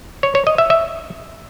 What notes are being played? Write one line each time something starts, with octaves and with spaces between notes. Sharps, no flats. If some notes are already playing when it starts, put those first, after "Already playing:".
C#5
C#5
D#5
E5
E5